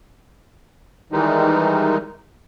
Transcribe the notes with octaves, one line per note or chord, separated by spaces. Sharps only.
D#3 E3 G3 G#3 D#4